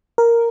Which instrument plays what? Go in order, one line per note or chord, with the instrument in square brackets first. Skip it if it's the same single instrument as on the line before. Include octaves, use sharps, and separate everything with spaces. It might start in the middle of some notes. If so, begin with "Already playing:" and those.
[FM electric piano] A#4